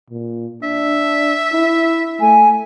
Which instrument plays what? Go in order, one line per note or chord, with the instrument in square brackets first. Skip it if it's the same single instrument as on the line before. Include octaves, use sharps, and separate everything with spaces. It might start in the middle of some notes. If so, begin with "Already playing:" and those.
[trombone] A#2
[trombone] D4 [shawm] E5
[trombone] E4
[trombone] A3 [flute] G#5